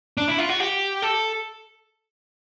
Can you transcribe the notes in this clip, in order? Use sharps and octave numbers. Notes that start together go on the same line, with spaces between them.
D4
E4
F4
F#4
G4
A4